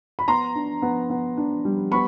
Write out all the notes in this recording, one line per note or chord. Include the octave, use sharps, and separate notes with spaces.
B5
B3 A#5 C6
D4
B3
B3
D4
G3
B3 B5 C#6